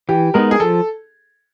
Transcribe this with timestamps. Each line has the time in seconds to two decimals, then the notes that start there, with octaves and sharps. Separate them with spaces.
0.09 E3 G4
0.34 G#3 B3 D#4 A#4
0.51 G#4
0.60 F3 A4